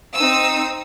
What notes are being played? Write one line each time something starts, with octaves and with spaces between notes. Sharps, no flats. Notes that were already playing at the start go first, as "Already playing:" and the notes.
C4 D#4 D#6 E6